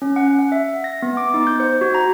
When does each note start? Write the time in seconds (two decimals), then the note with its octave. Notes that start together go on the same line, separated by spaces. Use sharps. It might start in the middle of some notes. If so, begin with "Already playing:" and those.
0.02 C#4
0.16 F#5
0.39 F#5
0.52 E5
0.84 A#6
1.02 B3
1.17 D6
1.34 D#4
1.47 G6
1.60 C5
1.81 F#4
1.95 A#5